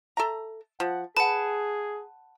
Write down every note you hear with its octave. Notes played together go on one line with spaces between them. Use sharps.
A4 E5 A#5
F3 F#5
G#4 B4 F#5 A5